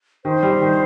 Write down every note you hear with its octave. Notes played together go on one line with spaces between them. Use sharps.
D#3 C5
G3
D#3